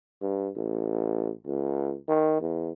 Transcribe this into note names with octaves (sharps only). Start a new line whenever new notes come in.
G2
A1
C#2
D#3
E2